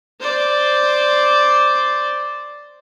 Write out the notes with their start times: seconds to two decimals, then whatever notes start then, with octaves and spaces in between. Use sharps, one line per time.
0.20 C5 D5